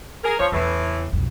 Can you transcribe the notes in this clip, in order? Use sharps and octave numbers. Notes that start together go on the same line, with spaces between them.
G#4 A#4
E2 F3 C#5
E2 A2 C#3 E3
B1 F2